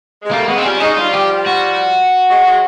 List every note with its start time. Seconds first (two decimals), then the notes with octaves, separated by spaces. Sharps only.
0.22 G#3
0.31 G3 A3 A#3
0.47 F#3 G#3 B3
0.58 C4
0.63 F3 G3 C#4
0.80 F#3 G#3 D#4
0.97 F3 G3 F4
1.14 G4
1.47 F#4
2.29 F#3 G#3
2.46 F#3 G#3